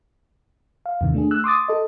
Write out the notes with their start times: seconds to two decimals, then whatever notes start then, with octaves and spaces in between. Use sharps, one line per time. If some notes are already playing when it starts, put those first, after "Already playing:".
0.86 F5
1.01 E2 C3 D#3
1.14 A3 D4 G#4
1.31 E6 F#6
1.44 C6 D6 D#6 A6
1.68 A4 D#5